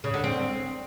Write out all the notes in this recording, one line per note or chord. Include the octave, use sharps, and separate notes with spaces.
C#3
D3
C4